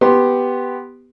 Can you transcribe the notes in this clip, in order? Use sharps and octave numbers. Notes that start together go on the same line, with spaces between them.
B3 G4 C6